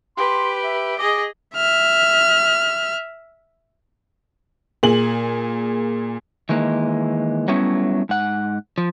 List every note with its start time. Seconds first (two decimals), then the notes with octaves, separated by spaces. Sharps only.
0.17 G4 B4 C6
0.64 E5
0.99 G#4 D#5 D6
1.55 E5 F6
4.83 A#2 G#4 F#7
6.49 D#3 E3 G#3 A#3
7.48 F#3 G3 A3 B3 C#4 E4
8.09 G#2 F#5
8.78 F3